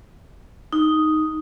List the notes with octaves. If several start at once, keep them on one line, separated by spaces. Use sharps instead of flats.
D#4